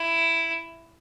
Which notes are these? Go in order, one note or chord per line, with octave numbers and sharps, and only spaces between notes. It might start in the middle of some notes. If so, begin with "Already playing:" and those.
Already playing: E4